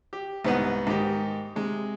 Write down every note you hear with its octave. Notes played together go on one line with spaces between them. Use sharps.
G4
C2 G#2 B3 D#4 B4 F#5
G#2 D#3 G4
C3 G#3